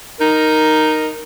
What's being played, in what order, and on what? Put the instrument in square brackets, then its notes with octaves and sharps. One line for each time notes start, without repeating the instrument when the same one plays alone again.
[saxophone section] D#4 A#4